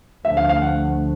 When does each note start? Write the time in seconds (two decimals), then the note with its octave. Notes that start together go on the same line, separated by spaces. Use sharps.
0.25 D2 D3 F3 A3 D4 E5
0.37 F5
0.49 F5
0.62 F#5